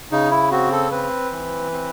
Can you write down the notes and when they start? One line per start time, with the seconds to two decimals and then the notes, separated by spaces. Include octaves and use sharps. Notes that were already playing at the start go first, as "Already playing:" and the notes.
0.12 C#3 D#4
0.31 E4
0.51 C4 F#4
0.72 A4
0.92 C4 B4
1.31 E3
1.72 C4